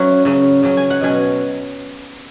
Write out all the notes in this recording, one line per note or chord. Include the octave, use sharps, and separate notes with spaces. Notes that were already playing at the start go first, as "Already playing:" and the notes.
Already playing: F#3 C#4 E5 F#5
C#3 F#3 C#4
C#3 F#3 C#4
G#5
F#5
B2 F#3 C#4 G#5